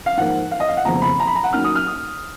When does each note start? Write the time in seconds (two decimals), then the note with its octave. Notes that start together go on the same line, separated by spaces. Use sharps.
0.06 F5
0.17 G#2 F3 A#3 F#5
0.51 F5
0.60 D#5
0.68 F5
0.77 F#5
0.85 F1 D#2 C#3 F3 B3 A#5
1.02 B5
1.20 A#5
1.27 B5
1.35 A#5
1.44 F#5
1.53 D#2 D#3 F#3 C#4 F6
1.65 D#6
1.76 F6
1.87 D#6